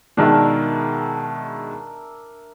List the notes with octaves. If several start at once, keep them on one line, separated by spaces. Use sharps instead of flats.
B2 D#3 G#3 D4 A#4 E5